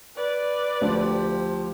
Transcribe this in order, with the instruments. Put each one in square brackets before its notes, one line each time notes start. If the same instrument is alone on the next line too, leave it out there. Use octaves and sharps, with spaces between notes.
[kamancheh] B4 D5
[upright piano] D2 [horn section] F3 G4